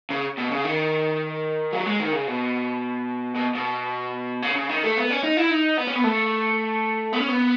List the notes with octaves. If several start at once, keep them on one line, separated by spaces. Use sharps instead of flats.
C#3
B2
C#3
D#3
F#3
G#3
D#3
C#3
B2
B2
B2
C#3
C#3
D#3
A3
B3
C#4
D#4
E4
D#4
B3
C#4
B3
A3
B3
C#4
B3